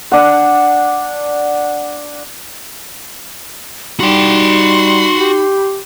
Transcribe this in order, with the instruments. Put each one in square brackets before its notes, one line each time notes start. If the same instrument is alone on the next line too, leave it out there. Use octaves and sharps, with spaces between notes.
[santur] D4 F#5
[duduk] G3 [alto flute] D#4 [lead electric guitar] F#4 G5 [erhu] C6
[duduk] G4